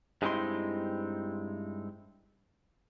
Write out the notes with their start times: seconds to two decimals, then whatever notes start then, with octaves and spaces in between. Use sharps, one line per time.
0.22 G2 G#3 C4 D#4 E4 C6